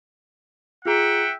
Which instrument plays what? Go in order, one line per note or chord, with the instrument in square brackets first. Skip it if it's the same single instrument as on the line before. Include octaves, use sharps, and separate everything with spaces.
[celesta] F4 G#4 A#5 [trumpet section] E5 F#5 G5